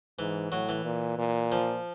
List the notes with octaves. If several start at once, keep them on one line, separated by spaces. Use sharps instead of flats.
G#2 E3
A2 F#3
E3
A#2
A#2
F3